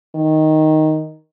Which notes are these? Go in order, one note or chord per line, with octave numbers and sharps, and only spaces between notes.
D#3